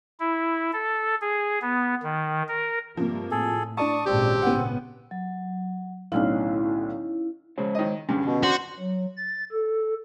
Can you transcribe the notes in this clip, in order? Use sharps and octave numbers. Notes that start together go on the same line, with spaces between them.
E4
A4
G#4
B3
D#3
A#4
G2 C3 F3 A#3
A2 G#4 A4
D4 D5 A5 C#6 D#6
G#1 A#2 C#3 C4 G4
B3 C#4 F#5
F#3
B1 A2 D3 C#4 D#4 E4 F5
C#3 G#3 C5 C#5
D#3 D#5
G2 D3 C#4
B2
D4 F#4 C5
F#3
A6
A4